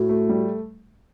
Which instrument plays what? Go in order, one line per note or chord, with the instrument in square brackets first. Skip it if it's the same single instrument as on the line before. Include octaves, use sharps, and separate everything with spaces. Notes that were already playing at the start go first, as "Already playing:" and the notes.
Already playing: [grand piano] A2 [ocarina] F#4
[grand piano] A3
G3